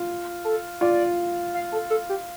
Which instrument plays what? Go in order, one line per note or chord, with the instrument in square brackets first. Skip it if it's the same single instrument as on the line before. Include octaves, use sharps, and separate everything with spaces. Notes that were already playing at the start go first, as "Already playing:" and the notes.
Already playing: [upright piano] F4
[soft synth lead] A4
[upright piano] F4 [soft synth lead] D5
[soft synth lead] F5
A4
A4
G4